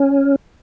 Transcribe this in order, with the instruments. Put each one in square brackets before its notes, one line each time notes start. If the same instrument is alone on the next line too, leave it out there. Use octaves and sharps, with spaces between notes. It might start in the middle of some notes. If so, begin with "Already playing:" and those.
Already playing: [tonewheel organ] C#4